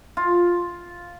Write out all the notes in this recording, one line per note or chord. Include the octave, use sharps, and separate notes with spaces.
F4